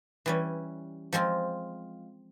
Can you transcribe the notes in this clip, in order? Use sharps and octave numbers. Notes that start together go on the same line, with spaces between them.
E3 G3 C#4
F3 G#3 C4 F4